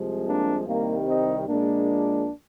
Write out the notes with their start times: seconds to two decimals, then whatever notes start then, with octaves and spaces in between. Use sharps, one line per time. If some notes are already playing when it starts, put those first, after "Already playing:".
Already playing: C2 C3 F3 G#3
0.28 A#3 D4
0.68 C2 C3 D#3 G3 A#3
1.07 C4 D#4
1.47 A#1 A#2 G#3 A#3 D4